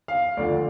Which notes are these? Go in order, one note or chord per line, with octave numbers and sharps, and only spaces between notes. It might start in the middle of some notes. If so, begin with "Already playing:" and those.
F5
D2 D3 F3 D5